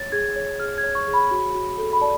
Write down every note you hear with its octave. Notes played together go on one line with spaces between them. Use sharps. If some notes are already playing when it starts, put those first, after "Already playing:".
Already playing: C#5 A6
G#4 G#6
C#5
G#4 F6
G#6
C#5
C#6
G#4
B5
F#4
F#4
A4
B5
D5 A5